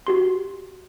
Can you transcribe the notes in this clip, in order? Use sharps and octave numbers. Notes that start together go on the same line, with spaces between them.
F#4 G4 C6